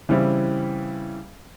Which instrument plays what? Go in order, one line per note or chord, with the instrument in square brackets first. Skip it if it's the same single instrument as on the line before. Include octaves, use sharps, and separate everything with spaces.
[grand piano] C#3 E3 G3 C4 E4